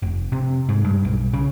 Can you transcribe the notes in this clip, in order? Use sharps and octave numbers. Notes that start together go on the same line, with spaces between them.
F1
C3
G#2
G2
B1
C#3